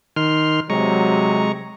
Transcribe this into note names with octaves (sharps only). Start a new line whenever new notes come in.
D#3 C6 F6
C3 F#3 G#3 A#5 C#6